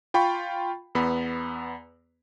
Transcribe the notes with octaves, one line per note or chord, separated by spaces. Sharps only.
F4 G5 B5 C#6
E2 B3 B5